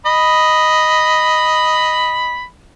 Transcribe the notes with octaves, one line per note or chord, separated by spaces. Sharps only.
D#5 B5